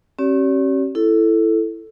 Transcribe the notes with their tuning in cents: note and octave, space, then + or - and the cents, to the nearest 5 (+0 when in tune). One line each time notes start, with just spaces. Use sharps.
C#4 -35 G4 -40 D5 -45
E4 +10 A4 +0